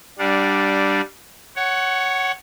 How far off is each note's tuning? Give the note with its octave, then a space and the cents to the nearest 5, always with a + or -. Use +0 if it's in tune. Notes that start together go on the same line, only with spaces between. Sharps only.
G3 -10 D4 +0 F#5 -40
C#5 +0 F#5 +15